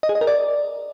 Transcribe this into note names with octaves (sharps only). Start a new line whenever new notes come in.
D#5
G#4
D#5
A#4
D5